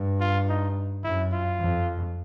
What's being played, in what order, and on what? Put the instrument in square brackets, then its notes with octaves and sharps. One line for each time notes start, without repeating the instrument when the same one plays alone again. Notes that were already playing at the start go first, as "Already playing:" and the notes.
Already playing: [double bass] G2
[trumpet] F4
D#4
[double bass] F#2 [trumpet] E4
[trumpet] F4
[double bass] F2